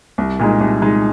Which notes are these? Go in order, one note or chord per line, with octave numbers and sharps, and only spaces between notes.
C2
A#2 G#3 D#4
C2
A#2 G#3 D#4